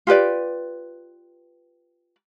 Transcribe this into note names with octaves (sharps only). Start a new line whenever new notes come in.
F4 G4 B4 D5